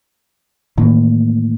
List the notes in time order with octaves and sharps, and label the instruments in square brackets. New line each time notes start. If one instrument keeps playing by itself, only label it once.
[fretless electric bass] A2 E3 A#3 [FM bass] D#3